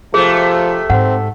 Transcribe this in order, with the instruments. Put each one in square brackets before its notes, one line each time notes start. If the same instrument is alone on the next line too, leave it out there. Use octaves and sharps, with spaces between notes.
[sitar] C3 A3 [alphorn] F3 [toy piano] G#4
[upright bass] G#2 [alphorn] C4 [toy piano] F#5